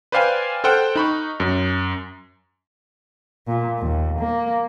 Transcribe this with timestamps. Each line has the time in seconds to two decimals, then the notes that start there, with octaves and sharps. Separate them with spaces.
0.12 B4 C5 D5 F5 G5 G#5
0.64 A4 C5 F#5 G5 F6 F#6
0.96 D#4 B5 C#6
1.40 F#2
3.47 A#2
3.79 D#2
4.20 A#3